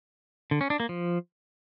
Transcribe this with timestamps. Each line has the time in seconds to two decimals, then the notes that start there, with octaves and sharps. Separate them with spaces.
0.51 D3
0.61 C#4
0.70 D4
0.80 A#3
0.89 F3